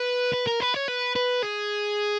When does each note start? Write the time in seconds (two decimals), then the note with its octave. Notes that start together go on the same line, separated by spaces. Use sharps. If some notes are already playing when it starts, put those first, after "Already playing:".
Already playing: B4
0.34 B4
0.47 A#4
0.61 B4
0.74 C#5
0.88 B4
1.15 B4
1.42 G#4